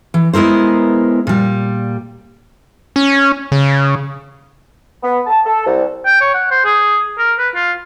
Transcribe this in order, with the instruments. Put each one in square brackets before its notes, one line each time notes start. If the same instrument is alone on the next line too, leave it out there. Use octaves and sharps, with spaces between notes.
[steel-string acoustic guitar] E3
G#3 B3 E4 A#4 C5
A#2 G3
[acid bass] C#4
C#3
[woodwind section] B3
A5
A4
C2
[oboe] G5
C#5
F#5
C5
G#4
A#4
B4
F4